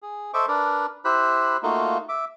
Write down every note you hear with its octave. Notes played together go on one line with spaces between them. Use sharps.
G#4
A4 C5 D#5 E5 C#6 D6
D4 A#4 B4 D5
E4 G4 C5 B5 F#6
A3 A#3 D#4 F4 F#4
E5 D6